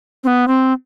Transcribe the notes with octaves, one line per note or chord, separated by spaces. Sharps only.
C4
B3
C4